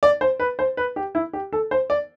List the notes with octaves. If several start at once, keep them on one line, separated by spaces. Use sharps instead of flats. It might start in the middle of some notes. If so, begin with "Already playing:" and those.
D5
C5
B4
C5
B4
G4
E4
G4
A4
C5
D5